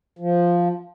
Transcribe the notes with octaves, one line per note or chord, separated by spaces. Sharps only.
F3